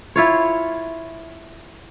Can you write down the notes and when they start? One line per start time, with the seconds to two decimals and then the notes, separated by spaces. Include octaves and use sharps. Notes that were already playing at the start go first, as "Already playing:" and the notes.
0.16 E4 F4 C#5